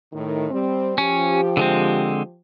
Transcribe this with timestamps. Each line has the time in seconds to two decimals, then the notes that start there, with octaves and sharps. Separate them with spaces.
0.13 A2 D#3
0.51 G3 C4
0.98 F3 C#4 G4
1.57 D3 G#3 C4